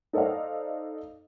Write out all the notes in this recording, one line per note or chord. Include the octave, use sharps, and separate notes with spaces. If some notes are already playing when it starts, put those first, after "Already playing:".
D#4 A4 C5 D5 D#5 F5